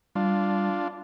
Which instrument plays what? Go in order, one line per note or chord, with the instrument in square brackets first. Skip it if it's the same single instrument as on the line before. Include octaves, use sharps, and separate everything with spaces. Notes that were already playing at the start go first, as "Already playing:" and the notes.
[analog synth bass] G3 [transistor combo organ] D4 F4